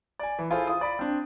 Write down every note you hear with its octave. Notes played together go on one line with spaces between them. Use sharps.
D5 G#5
E3
E4 F4 G#4 A4 C5
F4 D#6
D5 B5
C4 D4